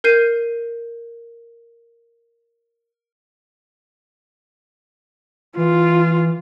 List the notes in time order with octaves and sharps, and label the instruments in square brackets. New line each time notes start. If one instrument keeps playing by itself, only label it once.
[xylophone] A#4 G6 C7 D#7
[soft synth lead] E3 [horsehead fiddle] F4